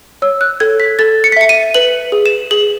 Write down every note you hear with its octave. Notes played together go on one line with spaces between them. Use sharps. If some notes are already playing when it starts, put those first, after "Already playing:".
C#5 E6
F#6
A4 G#6
B6
A4 A6
C#7
B6
E5 C#7
D#7
B4 F#7
G#4
E7
G#4 F#7